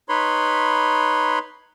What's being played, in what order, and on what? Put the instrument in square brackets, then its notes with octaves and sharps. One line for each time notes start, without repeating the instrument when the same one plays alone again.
[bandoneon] D#4 B4 C#5 B5 C6